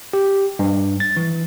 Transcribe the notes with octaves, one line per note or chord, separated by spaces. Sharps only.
G4
G2
A6
E3